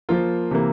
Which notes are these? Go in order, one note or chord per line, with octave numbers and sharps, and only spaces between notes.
F3 A#3 F4 A#4
C3 E3 A#3